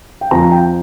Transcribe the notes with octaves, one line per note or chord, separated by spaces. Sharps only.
G5
F2 F3 A#5
G5